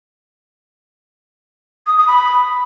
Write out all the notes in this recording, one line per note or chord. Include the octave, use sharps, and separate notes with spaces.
D#6
D#6
B5